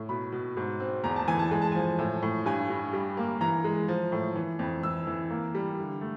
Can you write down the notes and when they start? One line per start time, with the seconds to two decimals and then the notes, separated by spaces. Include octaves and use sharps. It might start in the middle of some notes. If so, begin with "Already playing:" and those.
Already playing: A2
0.09 B2 B5
0.32 B2
0.57 G#2
0.80 C4
1.04 E2 A#5
1.16 A5
1.28 E3 G#5
1.39 A5
1.51 G#3 G#5
1.62 A5
1.72 F3 G#5
1.99 A2
2.22 A2
2.46 G2 G#5
2.70 G2
2.93 G3
3.17 A#3
3.41 E3 A#5
3.64 G#3
3.88 F3
4.12 A2
4.36 E3
4.59 F2
4.83 E3 E6
5.07 E3
5.30 A#3
5.55 G3
5.78 D3
6.01 A3